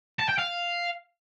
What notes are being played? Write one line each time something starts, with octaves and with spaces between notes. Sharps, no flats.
A5
G5
F5